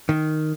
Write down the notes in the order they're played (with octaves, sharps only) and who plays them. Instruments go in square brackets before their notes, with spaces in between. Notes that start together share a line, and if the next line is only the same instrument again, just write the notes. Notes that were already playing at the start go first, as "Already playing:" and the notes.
[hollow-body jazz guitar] D#3